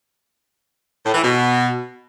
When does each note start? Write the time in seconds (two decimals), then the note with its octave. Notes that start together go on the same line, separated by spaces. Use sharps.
1.04 A2
1.14 E3
1.23 B2